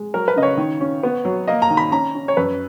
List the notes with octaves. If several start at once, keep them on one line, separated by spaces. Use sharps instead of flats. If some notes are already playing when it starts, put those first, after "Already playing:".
Already playing: G#3
F#3 A#4
B4
C#3 D#5
C#5
D#3
C#4
B3
F#3
A#3 D#5
A#5
D#3
B5
C#4 A#5
C#4
C#5
F#2 B4